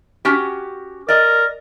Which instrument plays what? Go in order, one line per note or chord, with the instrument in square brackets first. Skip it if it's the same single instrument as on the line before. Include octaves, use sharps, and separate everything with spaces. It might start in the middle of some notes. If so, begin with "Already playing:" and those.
[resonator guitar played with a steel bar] C#4 F#4 G4
[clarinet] A#4 [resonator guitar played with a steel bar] D5 D#5